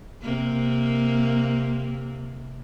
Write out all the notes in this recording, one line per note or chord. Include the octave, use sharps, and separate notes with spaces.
C3 A#3